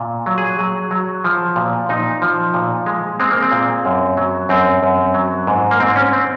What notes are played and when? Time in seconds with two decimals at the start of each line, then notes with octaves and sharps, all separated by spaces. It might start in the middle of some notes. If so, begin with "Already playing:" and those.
Already playing: A#2
0.26 F#3
0.38 G#4
0.59 F#3
0.91 F#3
1.24 F3
1.56 A#2
1.89 A#2 D#4
2.22 F3
2.54 A#2
2.86 G#3
3.20 G#3 C4
3.31 A#3
3.42 C4
3.51 A#2
3.85 F#2
4.17 F#3
4.49 F#2 C4
4.83 F#2
5.14 F#3
5.47 G#2
5.71 A#3
5.80 G#2 C4
5.96 C#4
6.13 C4